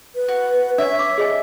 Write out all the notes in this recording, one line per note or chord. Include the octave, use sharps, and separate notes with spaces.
B4
F#4
D4 C#5 E5
D6
G#4 D#5 G#5